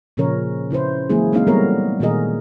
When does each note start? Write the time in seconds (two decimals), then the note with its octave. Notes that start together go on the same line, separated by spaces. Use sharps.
0.17 A#2 C#3 F3 C#4 A#4 C#5
0.71 C#3 E4 B4 C5
1.09 E3 F#3 G#3 A#3 E4 G#4
1.32 G#3 A#3 C4 D#4 E4 F5
1.47 F#3 G3 A3 B3 A#4 C#5
2.00 A#2 D#3 F#4 G#4 A#4 D#5